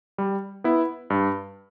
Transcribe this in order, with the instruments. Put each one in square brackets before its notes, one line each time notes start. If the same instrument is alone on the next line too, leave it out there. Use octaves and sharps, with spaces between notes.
[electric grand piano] G3
B3 E4
G2